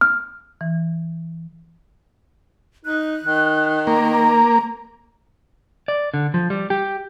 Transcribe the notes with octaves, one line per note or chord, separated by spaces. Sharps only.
F6
E3
D#4 F#6
D#3
A#3 A#5
D5
D3
F3
G3
G4